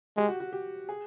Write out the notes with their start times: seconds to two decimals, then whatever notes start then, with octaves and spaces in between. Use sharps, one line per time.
0.17 G#3 G4
0.28 F#4
0.40 F#4
0.53 G4
0.89 G#4